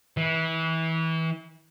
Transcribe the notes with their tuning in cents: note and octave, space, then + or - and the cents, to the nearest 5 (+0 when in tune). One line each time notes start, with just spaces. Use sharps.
E3 -25